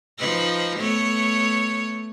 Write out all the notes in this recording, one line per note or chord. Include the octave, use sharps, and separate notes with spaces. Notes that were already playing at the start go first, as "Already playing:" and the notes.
F3 D#4 B4
A3 B3 C#5